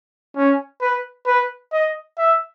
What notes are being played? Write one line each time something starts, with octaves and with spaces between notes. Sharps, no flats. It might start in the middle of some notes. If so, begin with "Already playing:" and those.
C#4
B4
B4
D#5
E5